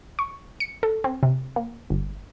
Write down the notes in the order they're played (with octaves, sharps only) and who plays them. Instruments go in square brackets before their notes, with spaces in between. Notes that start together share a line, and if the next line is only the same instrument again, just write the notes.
[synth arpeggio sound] C#6
C#7
A4
C4
C3
A#3
G1